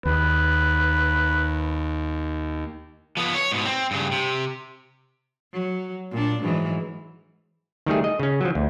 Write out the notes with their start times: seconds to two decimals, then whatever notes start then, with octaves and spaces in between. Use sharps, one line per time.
0.05 D#2 B4
3.17 F3 B3
3.35 C#5
3.52 G#2 B2
3.65 C4
3.91 G2 C#3
4.12 C3
5.53 F#3
6.12 A#2 D4
6.43 G#2 E3 F#3
7.86 D#3 G3 A3 G#4
8.04 D#5
8.20 C#3 C#4
8.41 F3 F#3
8.55 D2